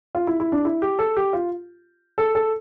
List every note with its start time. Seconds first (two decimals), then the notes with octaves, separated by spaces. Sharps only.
0.15 F4
0.27 E4
0.40 E4
0.52 D4
0.65 E4
0.82 G4
0.99 A4
1.17 G4
1.33 F4
2.18 A4
2.35 A4